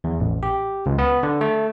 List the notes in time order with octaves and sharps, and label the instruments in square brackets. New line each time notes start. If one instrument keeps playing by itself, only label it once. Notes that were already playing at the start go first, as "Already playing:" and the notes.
[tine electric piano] E2
A1
G4
C#2
B3
D3
A3